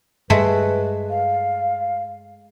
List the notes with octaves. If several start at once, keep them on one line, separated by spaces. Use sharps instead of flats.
G2 G#3 A3 A4 B4
F5